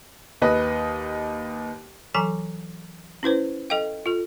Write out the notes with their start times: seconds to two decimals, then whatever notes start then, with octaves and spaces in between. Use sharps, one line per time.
0.42 D#2 B4 D#5
2.14 E3 F#3 A4 G#5 A#5
3.23 C#4 E4 B4 C5
3.70 A4 D#5 F5 G5
4.06 F4 A4